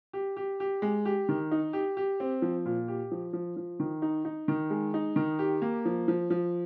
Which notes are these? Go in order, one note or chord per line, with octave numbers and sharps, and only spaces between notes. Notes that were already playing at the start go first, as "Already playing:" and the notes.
G4
G4
G4
G#3
G4
D#3
D#4
G4
G4
C4
F3
A#2
G4
F3
F3
F3
D#3
D#4
D#4
D#3
G#3
D#4
D#3
G4
A#3
F3
F3
F3